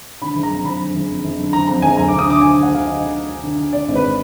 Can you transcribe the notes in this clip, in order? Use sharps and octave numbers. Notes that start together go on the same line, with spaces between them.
D3 B5
F#1
A#5
F2
F#1 B5
D3
F#1
F2
F#1
D3
F#1 A#5
F2 A#5
F#1 G#5
D2 A#5
D2 D6
D#6
D3 D6
D3 G#5
D2
F#5
D2 F5
D3 D#5
D3
D2
D2
D3
D3
D3 D5
G#1
B4